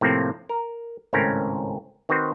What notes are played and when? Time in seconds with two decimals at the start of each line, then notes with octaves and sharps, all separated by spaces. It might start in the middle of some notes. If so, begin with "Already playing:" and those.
0.01 A2 C3 F3 A#3 C4
0.49 A#4
1.13 G#1 C#2 A2 C4 C#4 A#4
2.09 D#3 C4 F#4 B4 C5